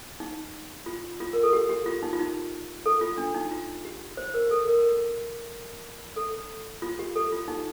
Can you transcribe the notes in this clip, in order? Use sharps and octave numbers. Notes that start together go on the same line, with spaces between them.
D#4
F4
F4
A#4
A4
G4
G4
F4
D#4
F4
D#4
A4
F4
D4
D#4
F4
G4
C5
A#4
A4
A#4
A4
F4
G4
A4
F4
D#4